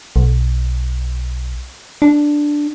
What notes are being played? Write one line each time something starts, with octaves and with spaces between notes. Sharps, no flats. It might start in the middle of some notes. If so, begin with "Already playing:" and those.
B1
D4